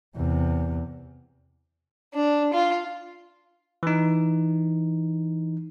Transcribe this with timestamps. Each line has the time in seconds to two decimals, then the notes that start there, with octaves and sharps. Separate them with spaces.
0.16 E2 C3
2.14 D4
2.53 F4
3.83 E3 D#4